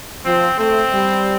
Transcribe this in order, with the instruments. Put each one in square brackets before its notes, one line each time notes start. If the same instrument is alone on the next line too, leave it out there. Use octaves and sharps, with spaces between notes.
[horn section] F3 [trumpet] C4
[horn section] A3 [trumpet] C4
[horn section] G3